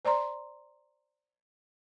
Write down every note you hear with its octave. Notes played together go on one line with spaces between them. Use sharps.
C5 D5 A#5 C6